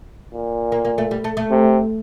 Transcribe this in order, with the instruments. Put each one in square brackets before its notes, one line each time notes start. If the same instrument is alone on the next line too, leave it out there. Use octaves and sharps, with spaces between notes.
[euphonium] A#2
[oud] A#3
A#3
A3
G3
A3
A3
[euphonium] C3